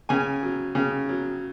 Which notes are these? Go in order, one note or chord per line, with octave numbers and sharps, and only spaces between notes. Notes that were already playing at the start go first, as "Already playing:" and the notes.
C#3 G#5
F#3
C#3
F#3